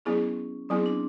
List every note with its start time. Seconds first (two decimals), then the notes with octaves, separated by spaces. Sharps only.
0.05 F#3 B3 C#4 E4 G#4
0.69 F#3 B3 C4 E4 G#4
0.86 D4